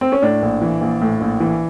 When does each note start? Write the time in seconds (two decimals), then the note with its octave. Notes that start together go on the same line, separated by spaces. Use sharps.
0.01 C4
0.12 C#4
0.22 A2 D4
0.42 A#1
0.62 E3
0.81 A#1
1.01 A2
1.21 A#1
1.40 E3